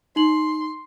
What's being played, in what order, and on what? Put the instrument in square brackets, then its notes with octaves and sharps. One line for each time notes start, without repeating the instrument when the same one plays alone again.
[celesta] D#4 F#7 [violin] C6